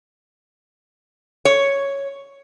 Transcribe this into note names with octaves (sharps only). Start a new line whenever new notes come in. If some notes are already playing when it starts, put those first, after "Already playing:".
C#5